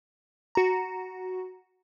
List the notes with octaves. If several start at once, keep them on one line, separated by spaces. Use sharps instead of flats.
F#4 A#5